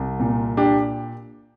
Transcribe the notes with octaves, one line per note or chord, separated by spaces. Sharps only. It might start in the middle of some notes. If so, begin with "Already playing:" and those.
Already playing: C2
A#2
D4 G4